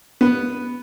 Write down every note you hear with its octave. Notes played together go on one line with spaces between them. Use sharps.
B3